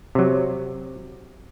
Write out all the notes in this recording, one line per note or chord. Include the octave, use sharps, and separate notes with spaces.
C3 F#3